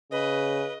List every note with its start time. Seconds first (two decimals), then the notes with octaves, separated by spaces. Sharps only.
0.12 C#3 B4 D#5